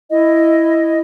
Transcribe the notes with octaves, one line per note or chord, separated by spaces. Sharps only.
E4 D#5